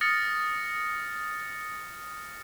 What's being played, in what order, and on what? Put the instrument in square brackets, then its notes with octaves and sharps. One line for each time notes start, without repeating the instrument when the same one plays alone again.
[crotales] D#6 F6 A6 A#6 C#7